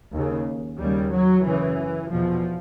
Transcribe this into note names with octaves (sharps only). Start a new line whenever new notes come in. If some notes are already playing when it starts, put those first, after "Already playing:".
D#2 C#3
D#2 C#3 G3
F#3
F#2 C#3 E3
E2 B2 F3